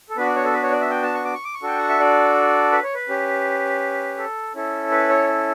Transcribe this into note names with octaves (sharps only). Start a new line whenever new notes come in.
A4
B3 D4 F#4 B4
D5
C#5
A4
B4
C#5
D5
E5
G5
A5
C#6
D6
C#6
D6
C#6
D4 F#4 A4 G5
F#5
E5
D5
B4
C#5
B4
C#4 G4
A4
C#4 E4 A4
B4
C#5